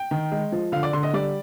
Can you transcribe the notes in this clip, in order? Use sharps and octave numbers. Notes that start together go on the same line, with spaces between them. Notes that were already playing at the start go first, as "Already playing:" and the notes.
Already playing: G5
D#3
G#3
F3
D3 F5
D5
D3 C6
D#5
G3 D5